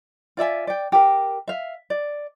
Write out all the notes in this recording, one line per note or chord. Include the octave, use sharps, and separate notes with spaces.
F4 D5 E5 G#5
D5 G5
G4 A#4
E5 F5
D5